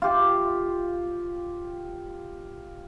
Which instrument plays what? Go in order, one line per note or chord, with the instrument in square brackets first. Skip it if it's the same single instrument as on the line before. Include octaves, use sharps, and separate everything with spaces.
[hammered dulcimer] F4 G4